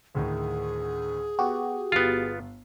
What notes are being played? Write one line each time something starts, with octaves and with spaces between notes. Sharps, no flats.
D2 A2 D#3 G#4
B3 F#4 G4
G1 B3 F4 C7